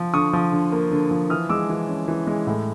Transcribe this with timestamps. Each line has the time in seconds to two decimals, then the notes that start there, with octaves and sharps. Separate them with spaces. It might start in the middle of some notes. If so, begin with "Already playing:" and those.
Already playing: F3
0.13 D3 C#6 D#6
0.33 F3
0.52 D3
0.72 A#3
0.91 D3
1.11 F3
1.30 E3 D#6 F6
1.49 G#3 D6 E6
1.69 E3
1.88 C#4
2.08 E3
2.27 G#3
2.47 A2